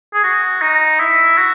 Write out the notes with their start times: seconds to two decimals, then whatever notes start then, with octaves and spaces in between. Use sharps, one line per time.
0.14 G#4
0.24 F#4
0.62 D#4
1.00 E4
1.38 F#4